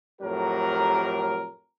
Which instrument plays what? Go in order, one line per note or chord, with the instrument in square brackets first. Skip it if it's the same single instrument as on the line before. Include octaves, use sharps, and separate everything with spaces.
[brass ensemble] F2 A2 F#3 G4 A#4